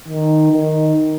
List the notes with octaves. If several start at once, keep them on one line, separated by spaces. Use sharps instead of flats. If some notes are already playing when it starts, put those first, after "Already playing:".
D#3
D#3